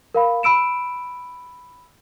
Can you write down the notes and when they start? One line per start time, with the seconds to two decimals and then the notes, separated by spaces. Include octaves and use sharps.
0.15 A#4 F5 B5
0.43 B5 E6 D7 E7